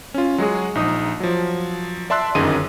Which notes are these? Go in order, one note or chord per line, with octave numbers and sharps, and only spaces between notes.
C#4 F4
F#3 G#3 F#4 G#4
A#1 D#4 D#6
F3 F#3
D5 E5 A5 C6 E6 F#6
G1 F#2 D#3 G#4 D#5 D#7